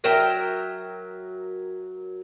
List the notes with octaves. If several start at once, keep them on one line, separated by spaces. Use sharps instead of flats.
F#3 A#4 E5 G5